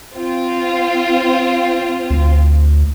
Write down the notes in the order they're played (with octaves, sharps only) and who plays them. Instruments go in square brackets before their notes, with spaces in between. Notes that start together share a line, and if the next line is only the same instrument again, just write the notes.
[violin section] C4 F4
[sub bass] D2